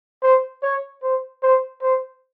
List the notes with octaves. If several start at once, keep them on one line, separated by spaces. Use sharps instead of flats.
C5
C#5
C5
C5
C5